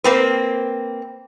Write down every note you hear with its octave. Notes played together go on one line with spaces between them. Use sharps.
A#3 C4 B4